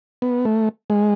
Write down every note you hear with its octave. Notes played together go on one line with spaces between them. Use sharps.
B3
A3
G#3